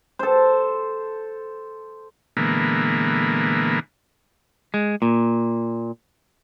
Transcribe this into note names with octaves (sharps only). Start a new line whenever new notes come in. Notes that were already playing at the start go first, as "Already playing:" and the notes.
A4 C5
A#2 D3 E3 G#3 A#3 B3
G#3
A#2